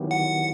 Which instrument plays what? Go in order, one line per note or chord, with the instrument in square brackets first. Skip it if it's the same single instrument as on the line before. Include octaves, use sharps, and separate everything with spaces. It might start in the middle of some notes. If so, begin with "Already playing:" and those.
Already playing: [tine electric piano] D#3 F#3 B3 E4 G4
[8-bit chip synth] F#5